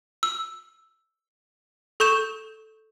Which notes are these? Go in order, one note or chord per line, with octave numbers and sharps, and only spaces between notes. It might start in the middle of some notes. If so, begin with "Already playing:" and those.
E6
A4 C#6 G6 E7